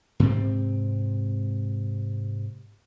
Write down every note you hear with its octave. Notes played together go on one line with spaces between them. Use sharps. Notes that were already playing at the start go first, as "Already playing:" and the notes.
G#2 C3 C4